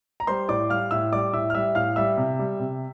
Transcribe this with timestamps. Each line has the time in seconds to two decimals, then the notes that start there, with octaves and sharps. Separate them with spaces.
0.20 A#5
0.27 G3 C5 C6
0.48 A2 D5 D6
0.70 G3 F5 F6
0.91 A2 E5 E6
1.12 G3 D5 D6
1.33 A2 E5 E6
1.50 F6
1.55 G3 E5 E6
1.75 A2 F5 F6
1.96 G3 E5 E6
2.17 C3
2.39 G3
2.59 C3